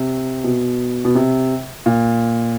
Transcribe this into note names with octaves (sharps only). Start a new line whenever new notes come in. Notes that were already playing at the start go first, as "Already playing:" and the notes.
Already playing: C3
B2
B2
C3
A#2